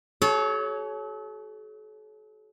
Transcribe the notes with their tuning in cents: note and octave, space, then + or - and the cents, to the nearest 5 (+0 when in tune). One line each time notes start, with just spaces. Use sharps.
F#4 +35 A4 -45 C#5 +0